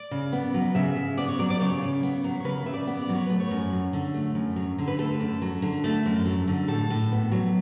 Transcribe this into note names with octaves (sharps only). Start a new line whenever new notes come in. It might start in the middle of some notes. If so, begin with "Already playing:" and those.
Already playing: D5
C#3
B3
F#3
C#3 E5
C#3
B3 D5
C#5
F#3 D5
D5
C#3 C#5
C#3
B3
F#3
C#5
C#3 B4
C#3 E5
D5
B3
D5
F#3
C#5
A3 B4
C#5
F#2
F#3
D3
A3
F#2
F#3
D3
B4
A3 A4
F#2
F#3
D3
A3 A4
F#2
F#3
D3
A2 A4
A2
B3
F#3